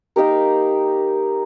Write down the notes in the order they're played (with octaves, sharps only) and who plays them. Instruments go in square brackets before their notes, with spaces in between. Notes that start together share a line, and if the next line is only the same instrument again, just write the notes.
[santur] A#3 D#4 G4 A#4